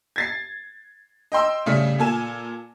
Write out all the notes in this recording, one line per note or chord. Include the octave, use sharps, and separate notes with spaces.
G#6 A6 C7
D#5 G5 C6 E6
A2 C#3 G3 A3
A#2 A4 G#5 E7